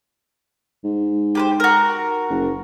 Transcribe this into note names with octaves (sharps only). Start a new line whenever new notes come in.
G#2
G4 B4 C5
F#4 A#4
F#1